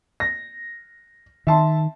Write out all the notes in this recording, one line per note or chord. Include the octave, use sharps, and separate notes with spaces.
A#6
D#3 E5 A5 C6